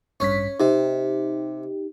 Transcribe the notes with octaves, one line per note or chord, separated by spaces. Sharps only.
A1 G2 C#4 B6
C3 D#4 G4